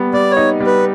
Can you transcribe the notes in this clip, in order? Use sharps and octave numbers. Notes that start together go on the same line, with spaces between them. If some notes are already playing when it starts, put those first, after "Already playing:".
Already playing: G3 B3
G3 D5
C#5
D#4
G3
B4